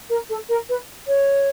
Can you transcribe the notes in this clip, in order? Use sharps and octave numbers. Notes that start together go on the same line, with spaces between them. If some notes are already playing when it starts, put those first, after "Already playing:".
A#4
A4
A#4
B4
C#5